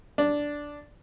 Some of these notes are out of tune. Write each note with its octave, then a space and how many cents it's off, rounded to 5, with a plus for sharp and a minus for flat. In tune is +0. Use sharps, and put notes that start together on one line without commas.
D4 -5